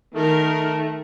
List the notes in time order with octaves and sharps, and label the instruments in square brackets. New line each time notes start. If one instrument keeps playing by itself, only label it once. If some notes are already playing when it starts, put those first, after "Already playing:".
[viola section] D#3 A#4 [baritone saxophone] A3